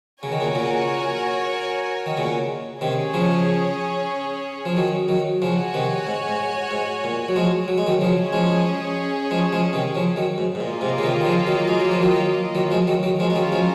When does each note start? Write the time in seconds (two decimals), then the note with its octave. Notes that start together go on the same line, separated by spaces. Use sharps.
0.22 C#3 F#4 A#4 C#5 G#5
0.32 D#3
0.40 A#2 C#3
0.55 A#2 C#3
2.06 D#3
2.17 A#2 C#3
2.81 C3 D#3 C#4 G#4 C#5
3.14 C#3 F3
4.65 F3
4.77 D#3 F#3
5.08 D#3 F#3
5.41 C#3 F3 F#4 C#5 G#5
5.74 C3 D#3
6.07 G#2
6.28 G#2
6.71 G#2
7.04 A#2
7.28 F#3
7.36 F3 G#3
7.68 F#3
7.78 G#3
7.87 D#3 F#3
8.01 C#3 F3 C#4 G#4 C#5
8.33 F3 G#3
9.31 F3 G#3
9.53 F3 G#3
9.73 C3 D#3
9.95 C#3 F3
10.16 D#3 F#3
10.38 G#2
10.55 G#2
10.60 A#2 A#3 F4 A#4 D#5
10.81 G#2 C3
10.98 C#3
11.03 C3 D#3
11.21 D#3
11.25 C#3 F3
11.47 D#3 F#3
11.68 G#3
11.80 F#3
11.91 F3
12.02 D#3 F#3
12.55 D#3 F#3
12.71 F3 G#3
12.87 D#3 F#3
13.03 D#3 F#3
13.19 F3 G#3 C#4 F4 A#4 C#5
13.30 G#3
13.35 D#3 F#3
13.52 F3 G#3